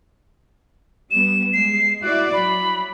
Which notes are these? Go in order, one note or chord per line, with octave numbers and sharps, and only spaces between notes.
G3 B3 E7
G#3 C7
E4 F#4 D5 F#6
F#3 B5